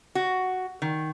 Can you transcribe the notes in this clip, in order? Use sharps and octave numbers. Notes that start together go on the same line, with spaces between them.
F#4
D#3